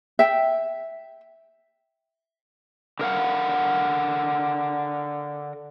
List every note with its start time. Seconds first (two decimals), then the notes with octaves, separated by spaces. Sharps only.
0.19 E5 G5
2.99 D3 A#4 F5 F#5